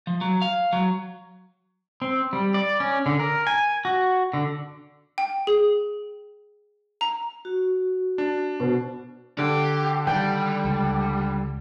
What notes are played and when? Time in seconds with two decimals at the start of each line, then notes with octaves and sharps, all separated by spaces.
0.07 F3
0.21 F#3
0.42 F5
0.73 F#3
2.02 C4
2.33 G3
2.54 D5
2.80 C#4
3.06 D3
3.19 A#4
3.47 G#5
3.85 F#4
4.33 D3
5.18 G5
5.47 G#4
7.01 A#5
7.45 F#4
8.18 D4
8.60 B2 C5
9.38 D3 G4
10.07 D#3 G3 G5
10.64 C#2